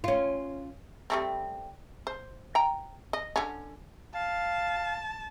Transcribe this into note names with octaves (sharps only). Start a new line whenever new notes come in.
C#4 F4
G3 A3 C4
C5
G5 A#5
D#5
D3 C#4
F5 A5